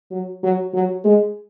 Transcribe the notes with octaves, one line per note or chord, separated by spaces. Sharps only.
F#3
F#3
F#3
G#3